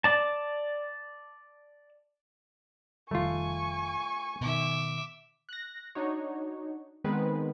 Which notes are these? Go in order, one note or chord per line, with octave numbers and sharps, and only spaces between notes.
D5 A5
F1 D#3 G3 A3 F4 G#5 C#6
B2 D#3 E5 D6
F#6 A#6
D4 D#4 F#4 C#5
D#3 G#3 B3 C4 B4